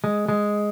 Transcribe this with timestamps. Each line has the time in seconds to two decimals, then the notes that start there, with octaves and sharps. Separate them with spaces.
0.04 G#3
0.29 G#3